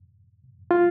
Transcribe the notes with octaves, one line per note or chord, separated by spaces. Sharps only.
F4